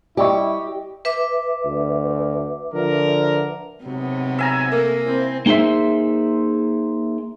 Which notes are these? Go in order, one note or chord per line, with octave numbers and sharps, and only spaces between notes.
G3 E4 G4 D5 D#5 C#6
B4 E5 D6
D2
D3 F3 A#4
G#2 C3 F#3 B3
E5 G#5 A#5
A3 A#3 A#4
C4 E4 C5
A#3 D#4 G#4 C5 E5